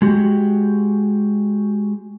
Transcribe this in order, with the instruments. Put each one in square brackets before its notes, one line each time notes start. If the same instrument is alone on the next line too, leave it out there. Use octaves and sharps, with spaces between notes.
[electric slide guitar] G#3 F#4 G4